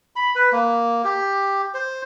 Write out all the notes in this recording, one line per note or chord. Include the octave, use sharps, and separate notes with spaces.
B5
B4
A#3
G4
C5